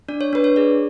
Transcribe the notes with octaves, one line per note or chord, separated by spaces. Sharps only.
D4 D5
C#5
D4 B4
C#5
G#4 D5